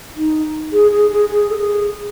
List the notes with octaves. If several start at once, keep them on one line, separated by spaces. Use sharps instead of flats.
D#4
G#4
G#4
G#4
G#4
A4
G#4